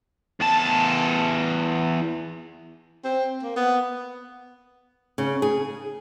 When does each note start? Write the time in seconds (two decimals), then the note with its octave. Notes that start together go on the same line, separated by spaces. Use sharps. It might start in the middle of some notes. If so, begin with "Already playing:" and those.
0.40 E2 A5
3.04 C4
3.43 A#3
3.57 B3
5.18 C#3
5.42 G#4